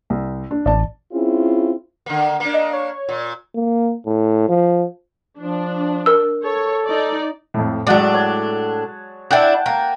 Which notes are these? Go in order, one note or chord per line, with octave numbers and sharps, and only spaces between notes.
C2
D4
A1 D5 A5
C4 C#4 E4 F4 G#4
D3 A#3
A#3 D4
D#5
C#5
A#2
A#3
A2
F3
F3 D4
A#4 E6
A4 C#5
D#4 D5
F2 A2
A2 F#3 G#3 D4 D5 F#5 A5
C#5
D4 E4 F#5 G5 A5
A#3 A#5